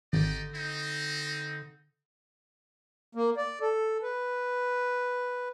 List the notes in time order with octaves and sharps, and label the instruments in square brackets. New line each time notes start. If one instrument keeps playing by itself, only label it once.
[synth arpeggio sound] G#1 [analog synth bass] D3 [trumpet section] D#4 G4 D5
[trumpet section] C4 D#4
[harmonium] A#3
D5
A4
B4